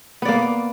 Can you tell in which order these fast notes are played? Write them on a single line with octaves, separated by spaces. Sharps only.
B3 D5 A#3